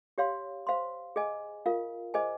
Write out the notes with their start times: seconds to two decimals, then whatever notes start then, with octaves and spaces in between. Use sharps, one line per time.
0.18 G4 C#5 F5 C6
0.67 C5 F5 C6
1.16 G#4 D#5 G#5
1.66 F4 A#4 F5
2.14 G#4 C5 D#5 G#5